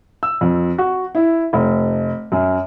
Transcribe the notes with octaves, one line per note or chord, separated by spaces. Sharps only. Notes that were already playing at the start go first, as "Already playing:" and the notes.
E6
F2
F#4
E4
F1
F#2